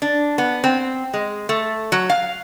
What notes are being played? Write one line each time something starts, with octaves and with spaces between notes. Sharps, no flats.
D4
B3
C4
G#3
A3
F#3
F5